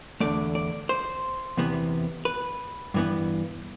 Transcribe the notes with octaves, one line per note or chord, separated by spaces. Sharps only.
E2 D3 A3 D5
D5
C5
E2 C3 E3 B3
B4
G2 E3 B3